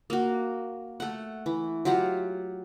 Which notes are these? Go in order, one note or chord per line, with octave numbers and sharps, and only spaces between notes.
A#3 F#4
A3 F#5
E3
F#3 F4 G4 F#5